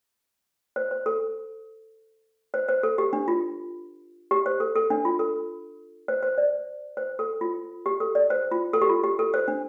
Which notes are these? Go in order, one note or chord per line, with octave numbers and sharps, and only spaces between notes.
C5
C5
A4
C5
C5
A4
G4
D4
F4
G4
C5
A4
A4
D4
F4
A4
C5
C5
D5
C5
A4
F4
G4
A4
D5
C5
F4
A4
G4
F4
G4
A4
C5
D4